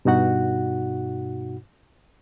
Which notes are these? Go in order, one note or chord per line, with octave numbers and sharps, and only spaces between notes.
G2 B2 D#4 F#4 F#5